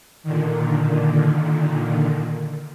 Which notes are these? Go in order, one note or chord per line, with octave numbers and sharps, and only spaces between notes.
A#2 D3 D#3